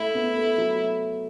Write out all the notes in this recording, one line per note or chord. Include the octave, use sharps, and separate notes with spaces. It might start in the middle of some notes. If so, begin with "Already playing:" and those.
Already playing: A3 E4
B3
A3
F#3